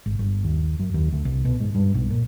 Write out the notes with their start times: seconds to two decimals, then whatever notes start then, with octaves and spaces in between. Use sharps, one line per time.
0.06 G#1
0.19 G1
0.44 D#2
0.80 F#2
0.94 D#2
1.13 D2
1.25 C2
1.45 B2
1.60 G#2
1.75 G2
1.94 B1
2.10 A#2